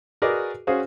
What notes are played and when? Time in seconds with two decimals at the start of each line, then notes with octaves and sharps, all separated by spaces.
0.22 F#4 G#4 A#4 B4 D5 D#5
0.67 C#4 F#4 G#4 C5 F5